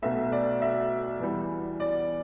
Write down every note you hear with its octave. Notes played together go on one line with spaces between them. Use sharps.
B1 B2 A3 E5
D5
E5
E2 E3 G3
D5